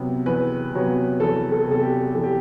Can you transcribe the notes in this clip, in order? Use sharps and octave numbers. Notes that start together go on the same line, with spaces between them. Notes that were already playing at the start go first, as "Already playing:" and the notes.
Already playing: C3 F#3 B3
E2 B4
C3 F#3 B3
E2 A4
A4
C3 F#3 B3 A4
G4
E2 A4
G4